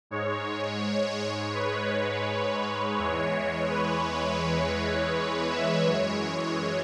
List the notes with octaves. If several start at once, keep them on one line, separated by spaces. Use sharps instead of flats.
G#2 G#3 C#5
B4
E2 E3 G#3 C#5
C#5
B4
C#5
E5
F#2 E3 G#3 C#5